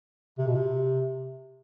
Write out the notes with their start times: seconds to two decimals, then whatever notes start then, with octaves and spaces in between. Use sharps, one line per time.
0.38 C3
0.47 B2
0.55 C3